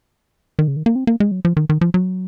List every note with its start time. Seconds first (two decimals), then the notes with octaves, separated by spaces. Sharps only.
0.59 D#3
0.68 C#3
0.76 D#3
0.86 A#3
0.96 C4
1.07 A#3
1.20 G#3
1.31 F#3
1.45 F3
1.57 D#3
1.69 D#3
1.81 F3
1.94 F#3